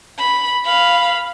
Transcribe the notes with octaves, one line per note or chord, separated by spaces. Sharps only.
B5
F5 B5